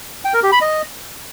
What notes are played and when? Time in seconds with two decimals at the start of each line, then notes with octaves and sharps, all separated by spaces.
0.25 G5
0.34 A#4
0.43 G4
0.52 B5
0.61 D#5